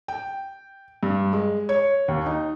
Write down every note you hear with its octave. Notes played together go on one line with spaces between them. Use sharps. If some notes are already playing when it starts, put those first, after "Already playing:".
G5
G2
G#3
C#5
D#2
D#4